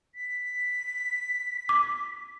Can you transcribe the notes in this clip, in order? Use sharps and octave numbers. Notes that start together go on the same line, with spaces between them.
B6
D6